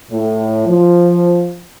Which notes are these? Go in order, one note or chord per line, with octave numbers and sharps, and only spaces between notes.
A2
F3